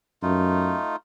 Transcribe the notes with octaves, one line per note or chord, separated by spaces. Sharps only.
F#2 A3 D#4 F4